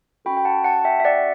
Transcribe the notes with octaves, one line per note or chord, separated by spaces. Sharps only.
C#4 F#4 A4 G5 B5
G5
F#5 A5
F#5 A5
E5 G5
E5
D5 F#5